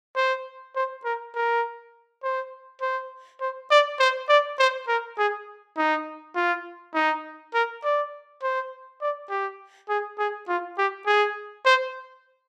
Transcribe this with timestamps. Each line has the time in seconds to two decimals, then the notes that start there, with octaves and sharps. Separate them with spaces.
0.16 C5
0.76 C5
1.05 A#4
1.35 A#4
2.23 C5
2.81 C5
3.41 C5
3.71 D5
4.00 C5
4.29 D5
4.59 C5
4.88 A#4
5.18 G#4
5.77 D#4
6.36 F4
6.95 D#4
7.54 A#4
7.84 D5
8.43 C5
9.01 D5
9.30 G4
9.89 G#4
10.19 G#4
10.48 F4
10.78 G4
11.07 G#4
11.66 C5